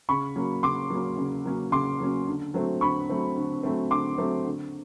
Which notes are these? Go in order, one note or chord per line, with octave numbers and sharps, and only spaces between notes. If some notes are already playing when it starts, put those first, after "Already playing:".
C#3 B5 C#6
F#3 A#3 C#4
C#3 C6 D6
F#3 A#3 C#4
C#3
F#3 A#3 C#4
C#3 C6 D6
F#3 A#3 C#4
D3
F#3 A3 C4
D3 B5 C#6
F#3 A3 C4
D3
F#3 A3 C4
D3 C6 D6
F#3 A3 C4
D3